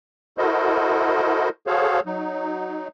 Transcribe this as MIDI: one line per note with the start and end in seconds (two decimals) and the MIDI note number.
0.38 1.49 64
0.38 1.49 66
0.38 1.49 69
0.38 1.49 70
0.38 1.49 72
0.38 1.49 75
1.67 2.00 66
1.67 2.00 68
1.67 2.00 69
1.67 2.00 72
1.67 2.00 73
1.67 2.00 77
2.06 2.88 54
2.06 2.88 63